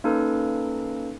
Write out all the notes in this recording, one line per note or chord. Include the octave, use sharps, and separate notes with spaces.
A#3 C#4 D#4 A4 B4